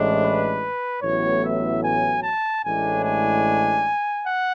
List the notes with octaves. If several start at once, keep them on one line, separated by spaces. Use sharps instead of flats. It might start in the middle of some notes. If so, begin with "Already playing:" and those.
Already playing: A1 A2 G#3 D4
B4
A1 A2 F#3 B3 C#5
E5
G#5
A5
A1 A2 G#3 D4 G#5
G#5
F#5